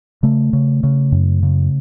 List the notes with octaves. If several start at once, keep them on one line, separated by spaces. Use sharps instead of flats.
C#3 A3
C#3
C#3
F#2
C#3